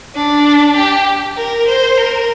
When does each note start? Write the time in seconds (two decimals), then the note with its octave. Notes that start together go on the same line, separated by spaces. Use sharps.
0.16 D4
0.76 G4
1.37 A#4
1.67 C5
1.97 A#4